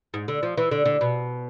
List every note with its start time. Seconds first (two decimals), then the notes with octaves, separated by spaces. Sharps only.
0.14 G#2
0.28 D3
0.43 F3
0.57 E3
0.71 D3
0.85 D3
1.01 B2